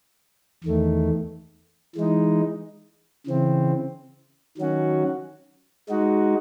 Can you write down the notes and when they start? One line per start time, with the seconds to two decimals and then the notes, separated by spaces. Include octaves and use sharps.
0.64 E2 D#3 A3
1.96 E3 G#3 D#4
3.27 C#3 E3 C4
4.57 D#3 F#3 C#4 F#4
5.89 G#3 D#4 F#4